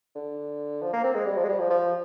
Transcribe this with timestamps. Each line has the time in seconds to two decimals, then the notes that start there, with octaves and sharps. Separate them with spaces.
0.15 D3
0.82 F3
0.93 A#3
1.04 C4
1.15 G#3
1.26 G3
1.37 F3
1.44 G#3
1.49 G3
1.59 F3
1.70 F3